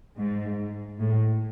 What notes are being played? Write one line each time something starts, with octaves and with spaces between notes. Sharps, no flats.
G#2
A2